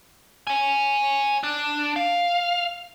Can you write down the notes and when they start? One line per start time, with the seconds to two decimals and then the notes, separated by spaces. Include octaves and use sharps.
0.47 C#5 G#5
1.43 D4
1.96 F5